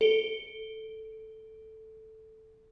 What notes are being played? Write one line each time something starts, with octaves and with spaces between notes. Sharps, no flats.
A4 D7 G7